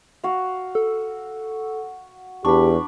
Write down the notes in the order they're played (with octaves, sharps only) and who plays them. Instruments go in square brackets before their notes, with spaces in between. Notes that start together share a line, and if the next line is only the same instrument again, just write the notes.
[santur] F#4 F5
[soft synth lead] A4
[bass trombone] E2 [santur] D4 B5 [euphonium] G4 [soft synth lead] C#6